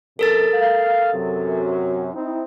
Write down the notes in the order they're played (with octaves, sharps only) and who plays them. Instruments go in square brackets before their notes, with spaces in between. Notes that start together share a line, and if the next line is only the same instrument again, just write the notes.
[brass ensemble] F#2 C3 [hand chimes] A4 A#4 A6
[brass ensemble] F5
F#2 C3 F#3
C4 D#4 E4